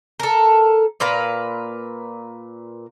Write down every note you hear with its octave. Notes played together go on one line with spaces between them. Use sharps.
A4 A#4
A#2 A#4 B4 F5